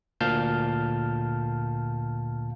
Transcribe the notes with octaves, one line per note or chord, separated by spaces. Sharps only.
D2 A#2 F5 A5 F6 G6